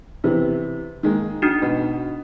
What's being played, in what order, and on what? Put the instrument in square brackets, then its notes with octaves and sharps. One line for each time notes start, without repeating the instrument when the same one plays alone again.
[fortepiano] C3 E3 B3
D#3 G#3 A#3
[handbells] D4 D#4 F#4
[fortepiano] B2